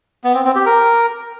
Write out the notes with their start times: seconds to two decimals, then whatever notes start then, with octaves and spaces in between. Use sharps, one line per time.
0.24 B3
0.34 C4
0.45 C4
0.55 G4
0.66 A#4